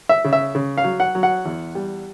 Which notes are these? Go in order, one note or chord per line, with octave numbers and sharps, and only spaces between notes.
E5
C#3
E5
C#3
F5
F#3
F#5
F#3
F#5
E2
G3